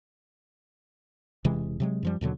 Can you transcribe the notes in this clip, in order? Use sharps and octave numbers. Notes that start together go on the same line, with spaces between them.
E1 C3 E3 G#3
C3 F#3 G#3
F#2 F3 G3
D#2 B2 D3 F#3